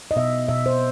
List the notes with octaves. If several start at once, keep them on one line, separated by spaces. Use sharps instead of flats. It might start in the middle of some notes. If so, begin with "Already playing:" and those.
D#5
B2 E5
B2 E5
C5